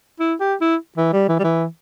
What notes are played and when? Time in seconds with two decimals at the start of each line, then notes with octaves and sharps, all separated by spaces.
0.20 E4
0.40 G4
0.61 E4
0.97 E3
1.13 G3
1.28 E3
1.39 G3
1.44 E3